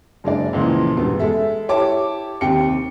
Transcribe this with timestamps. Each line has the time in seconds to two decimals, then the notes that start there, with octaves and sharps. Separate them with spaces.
0.24 F#1 G#3 D4 D5
0.53 C#2 A#2 E3 F3
0.97 E1 G2 B3
1.19 G#3 A4 E5
1.69 E4 G4 C#5 A5 D6
2.41 D#2 C3 G5 C#7